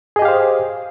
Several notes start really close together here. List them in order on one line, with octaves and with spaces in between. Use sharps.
G#4 D#5 G4 F5 C5